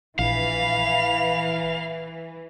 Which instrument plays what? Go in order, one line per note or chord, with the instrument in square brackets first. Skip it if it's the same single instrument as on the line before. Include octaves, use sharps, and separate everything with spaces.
[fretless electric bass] A#1 [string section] E3 [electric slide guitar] F5 [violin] B5 F7